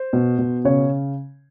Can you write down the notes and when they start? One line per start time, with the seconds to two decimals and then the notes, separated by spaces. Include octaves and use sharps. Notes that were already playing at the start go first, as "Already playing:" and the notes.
Already playing: C5
0.13 B2
0.39 B2
0.65 C#3 C#5